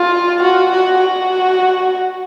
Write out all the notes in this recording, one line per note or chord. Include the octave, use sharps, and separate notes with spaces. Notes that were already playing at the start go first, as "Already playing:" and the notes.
Already playing: F4
F#4
F#4
F#4